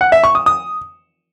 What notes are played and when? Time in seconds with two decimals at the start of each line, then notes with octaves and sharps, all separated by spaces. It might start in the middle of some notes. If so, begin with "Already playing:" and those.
0.01 F#5
0.12 E5
0.24 C#6
0.35 D#6
0.46 D#6